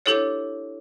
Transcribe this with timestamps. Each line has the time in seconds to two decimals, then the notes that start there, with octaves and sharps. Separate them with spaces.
0.06 D4 E4 G4 A4 C#5